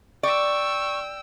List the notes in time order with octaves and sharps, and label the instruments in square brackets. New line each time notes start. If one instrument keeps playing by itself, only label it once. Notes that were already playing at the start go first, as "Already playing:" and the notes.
[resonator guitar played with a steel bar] D5 [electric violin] G5 E6 [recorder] C#6